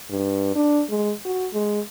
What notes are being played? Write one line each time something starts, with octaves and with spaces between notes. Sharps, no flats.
G2
D4
G#3
F#4
G#3